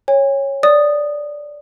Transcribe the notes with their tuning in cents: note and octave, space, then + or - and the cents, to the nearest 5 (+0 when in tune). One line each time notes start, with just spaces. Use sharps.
C#5 -10 G#5 -45
D5 +0 D#6 -10